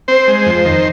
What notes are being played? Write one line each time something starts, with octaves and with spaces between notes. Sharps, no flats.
C4 C5
G#3
F2
D#3